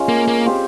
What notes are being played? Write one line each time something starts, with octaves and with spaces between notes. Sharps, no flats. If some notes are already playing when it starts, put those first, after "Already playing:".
Already playing: G#3 C#4 F4
A#3
A#3
C4 G4 C5 F5